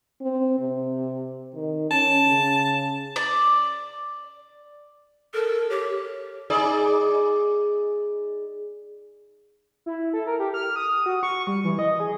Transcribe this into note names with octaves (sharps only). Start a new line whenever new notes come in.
C4
C3
D#3
C#4 A5
C#3
D5
A4 A#4
G4 C#5
D#4 G#4 D5
E4
A4
A#4
G4
F6
D#6
F#4
C#6
G3
E3
D#5
G#4